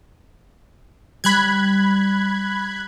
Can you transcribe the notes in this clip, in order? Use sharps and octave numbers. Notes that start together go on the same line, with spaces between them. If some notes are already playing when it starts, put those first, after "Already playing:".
G3 B5 F#6 G#6